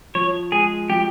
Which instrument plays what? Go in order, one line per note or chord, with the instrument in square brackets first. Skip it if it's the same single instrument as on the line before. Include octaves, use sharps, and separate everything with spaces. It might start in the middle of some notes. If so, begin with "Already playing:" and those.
[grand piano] F3 [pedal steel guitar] C#5
[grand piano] G#3 [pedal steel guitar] G#4
[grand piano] F3 [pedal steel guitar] G4